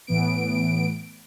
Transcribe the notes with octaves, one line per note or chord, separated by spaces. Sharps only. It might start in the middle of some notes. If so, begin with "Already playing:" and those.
A2 E3 B3 D7